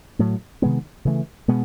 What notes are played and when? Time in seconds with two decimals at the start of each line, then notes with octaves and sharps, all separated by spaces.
0.19 A2 F#3 A3
0.62 C3 D#3 G#3 B3
1.05 C#3 E3 A3
1.48 B2 G#3 B3